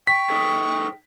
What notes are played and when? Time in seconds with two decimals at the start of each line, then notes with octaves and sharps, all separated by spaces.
0.07 G5 C#6 B6
0.30 D#4 G#4 A4